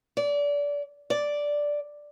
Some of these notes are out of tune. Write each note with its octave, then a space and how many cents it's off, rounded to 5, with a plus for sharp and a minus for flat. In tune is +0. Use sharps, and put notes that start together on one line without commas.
D5 -25
D5 -5